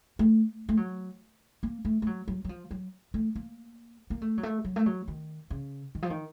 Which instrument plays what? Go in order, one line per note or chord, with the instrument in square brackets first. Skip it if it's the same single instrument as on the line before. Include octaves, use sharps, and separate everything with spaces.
[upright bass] A3
A3
F#3
A#3
A3
A3
F#3
F#3
F#3
F3
F#3
A3
A#3
A#3
A3
F#3
A3
F#3
A3
F#3
D#3
C#3
D#3
F3
D#3